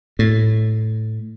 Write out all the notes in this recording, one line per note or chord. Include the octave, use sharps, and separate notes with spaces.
A2